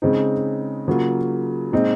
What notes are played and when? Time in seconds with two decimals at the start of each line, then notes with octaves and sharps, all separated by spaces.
0.02 C#3 G#3 C4 D#4
0.88 C#3 F#3 A#3 F4
1.72 A#2 G#3 C4 D#4